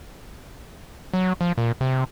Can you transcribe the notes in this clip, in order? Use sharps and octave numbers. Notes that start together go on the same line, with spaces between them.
F#3
F3
A#2
C3